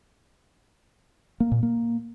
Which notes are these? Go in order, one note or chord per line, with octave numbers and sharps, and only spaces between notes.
A#3
A#2
A#3